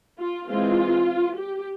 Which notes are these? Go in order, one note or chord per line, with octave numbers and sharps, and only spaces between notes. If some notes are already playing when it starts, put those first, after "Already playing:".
F4
E3 G#3 C4 F4
G4